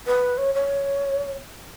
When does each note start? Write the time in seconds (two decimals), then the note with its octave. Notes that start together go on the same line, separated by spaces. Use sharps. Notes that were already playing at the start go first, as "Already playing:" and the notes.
0.07 B4
0.38 C#5
0.55 C#5